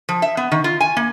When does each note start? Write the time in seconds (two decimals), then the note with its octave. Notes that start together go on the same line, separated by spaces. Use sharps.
0.09 F3
0.22 E5
0.37 B3
0.52 D#3
0.64 F4
0.80 G#5
0.97 A#3